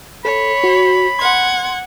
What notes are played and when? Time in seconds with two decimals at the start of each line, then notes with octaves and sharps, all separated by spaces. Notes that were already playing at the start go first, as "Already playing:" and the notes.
0.25 A4 C#5 B5
0.64 F#4
1.19 F#5 C6 G#6